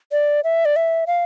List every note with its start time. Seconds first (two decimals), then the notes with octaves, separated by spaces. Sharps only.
0.12 D5
0.44 E5
0.65 D5
0.76 E5
1.07 F5